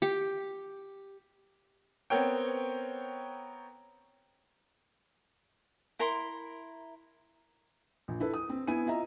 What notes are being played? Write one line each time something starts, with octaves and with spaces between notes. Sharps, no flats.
G4
B3 C4 A#4 C#5 G5
E4 A#4 A#5 C6
A#1
E4 A4 B4
D#6
C4
B3 E4 G#5 D#7
F4 D#5 E5 A#5